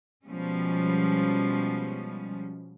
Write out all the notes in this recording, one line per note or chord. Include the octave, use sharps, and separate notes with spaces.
B2 F3 G3 G#3 C#4